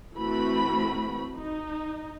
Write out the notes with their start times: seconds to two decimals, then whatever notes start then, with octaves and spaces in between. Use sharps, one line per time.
0.15 E3 A3 C4 F#4 B5
1.37 D#4